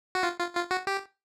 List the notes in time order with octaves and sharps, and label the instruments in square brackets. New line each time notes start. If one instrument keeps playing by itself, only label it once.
[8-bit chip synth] F#4
F4
F4
F4
F#4
G4